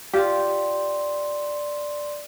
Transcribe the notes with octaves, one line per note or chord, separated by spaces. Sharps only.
F4 G4 D5 C6